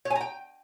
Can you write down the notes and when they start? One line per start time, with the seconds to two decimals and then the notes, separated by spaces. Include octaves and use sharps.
0.05 C#5
0.10 G#5
0.15 A#5
0.21 G5